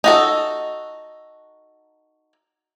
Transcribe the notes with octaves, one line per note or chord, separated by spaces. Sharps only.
D#4 F#4 A4